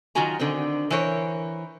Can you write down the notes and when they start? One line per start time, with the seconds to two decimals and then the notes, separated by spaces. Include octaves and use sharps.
0.15 D#3 F#3 F4 F#4 G#5 A#5
0.39 D3 D#3 C4
0.90 E3 A#4 C5 C#5